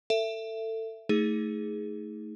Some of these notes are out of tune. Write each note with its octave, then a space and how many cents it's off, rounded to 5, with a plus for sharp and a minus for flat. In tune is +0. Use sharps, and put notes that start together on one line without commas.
A4 +25 E5 +15
A3 +0 D#4 +30 G#4 +0